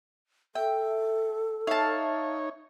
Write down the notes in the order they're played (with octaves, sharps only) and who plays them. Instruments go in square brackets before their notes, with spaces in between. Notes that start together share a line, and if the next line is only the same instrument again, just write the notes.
[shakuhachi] A4 [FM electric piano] E5 [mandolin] G5
[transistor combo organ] D#4 C#5 [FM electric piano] E5 [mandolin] F5 A5